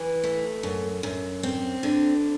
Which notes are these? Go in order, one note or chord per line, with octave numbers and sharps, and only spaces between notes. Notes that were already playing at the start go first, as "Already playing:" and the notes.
Already playing: E3
A3
F#2
F#2
C4
D3